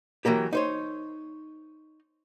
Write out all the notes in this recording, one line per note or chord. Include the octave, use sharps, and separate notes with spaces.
E3 F#3 A#3 G4
D#4 C5 C#5